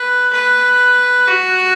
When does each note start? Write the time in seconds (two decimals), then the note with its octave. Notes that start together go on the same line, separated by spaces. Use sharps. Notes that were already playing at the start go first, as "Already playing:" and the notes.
Already playing: B4
0.33 B4
1.28 F#4